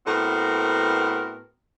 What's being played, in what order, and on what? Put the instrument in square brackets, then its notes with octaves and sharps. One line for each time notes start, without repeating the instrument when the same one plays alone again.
[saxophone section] A2 B3 C4 F#4 A#4